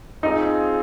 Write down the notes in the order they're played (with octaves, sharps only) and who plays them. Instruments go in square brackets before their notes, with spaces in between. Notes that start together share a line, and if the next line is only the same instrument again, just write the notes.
[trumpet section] C4 F4 G#4 [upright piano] D#4